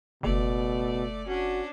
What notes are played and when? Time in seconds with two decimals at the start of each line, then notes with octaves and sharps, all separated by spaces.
0.23 F#1 B2 A3 D5
1.27 C#4 D4 F#4